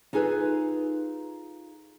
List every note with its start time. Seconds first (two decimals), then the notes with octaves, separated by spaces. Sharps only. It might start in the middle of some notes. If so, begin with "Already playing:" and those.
0.13 D#4 F4 G#4 A4 B4